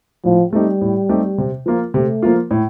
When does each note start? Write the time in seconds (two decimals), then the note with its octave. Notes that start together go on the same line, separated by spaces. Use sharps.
0.25 A2 F3
0.53 G3 A3 C4 D#4 G4
0.81 A2
1.09 A3 C4 D#4 G4
1.38 C3
1.66 F3 A#3 F4
1.94 C3 A3
2.23 F3 A#3 F4
2.51 A2